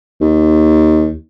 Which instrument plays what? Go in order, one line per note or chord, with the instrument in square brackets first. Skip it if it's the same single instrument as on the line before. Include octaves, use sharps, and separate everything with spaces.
[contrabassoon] D#2